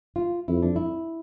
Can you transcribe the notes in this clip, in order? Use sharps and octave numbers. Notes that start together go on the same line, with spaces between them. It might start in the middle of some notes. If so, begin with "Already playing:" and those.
F4
F2 E4
D4
E4